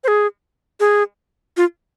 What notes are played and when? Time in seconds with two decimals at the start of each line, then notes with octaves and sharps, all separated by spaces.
0.04 C5
0.08 G#4
0.80 G#4
1.57 F4